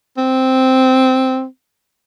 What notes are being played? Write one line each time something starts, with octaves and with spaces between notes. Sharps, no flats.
C4